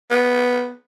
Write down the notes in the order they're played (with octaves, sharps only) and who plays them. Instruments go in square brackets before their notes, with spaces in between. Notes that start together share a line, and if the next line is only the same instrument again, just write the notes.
[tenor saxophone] B3